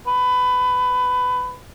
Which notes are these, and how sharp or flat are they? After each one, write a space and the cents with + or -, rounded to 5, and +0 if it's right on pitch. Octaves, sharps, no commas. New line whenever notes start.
B4 +20